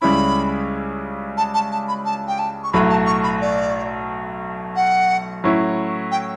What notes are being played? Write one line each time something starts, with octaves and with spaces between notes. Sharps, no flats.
C#2 C#3 G3 C#4 E4 B5
A5
A5
A5
B5
A5
G5
A5
C#6
B1 A2 F#3 A3 B5
A5
C#6
B5
D5
F#5
A2 F#3 C#4 E4
G5